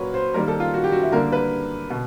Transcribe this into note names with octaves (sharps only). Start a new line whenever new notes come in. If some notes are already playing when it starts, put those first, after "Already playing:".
Already playing: A#2 F#3 A#3 B4 C#5
C5
D#3 G3 A#3 A#4
A4
F4
F#4
G4
F#4
E4
D3 G3 A#3 A#4
B4
B2